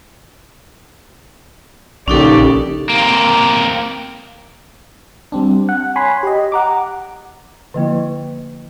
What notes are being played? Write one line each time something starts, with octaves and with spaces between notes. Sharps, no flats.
A#1 C#3 C#4 D#4 G4 A4 D5
A#3 C4
G3 C4 D4
F#5
C#5 G#5 B5 C6
G4 D#5
F#5 A#5 D6
D3 F3 A#3 E4